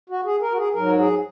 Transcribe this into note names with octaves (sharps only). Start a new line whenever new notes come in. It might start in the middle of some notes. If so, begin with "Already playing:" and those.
F#4
G#4
A#4
F#4
G#4
G#2 F#3 A#4
G#4